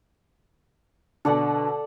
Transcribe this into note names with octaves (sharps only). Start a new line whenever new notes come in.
B2 D3 A4 D5 F#5